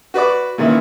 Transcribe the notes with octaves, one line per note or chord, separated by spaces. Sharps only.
F#4 B4 D5 D6
A#2 D#3 E3 C#4 E4